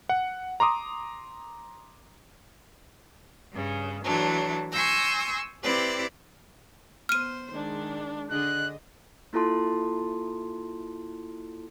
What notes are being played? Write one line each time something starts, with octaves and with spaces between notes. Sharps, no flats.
F#5
A#5 C6 D6 D#6
G2 C#3
E3 F#3 A3 D4
G#5 C6 C#6 E6 G6 A#6
C4 E4 G4 B4 D5
B3 C5 F6 D#7
D#3 G#3 D4
D3 D4 G#4 D#5 F#6
A#3 E4 F4 A4 A5 C6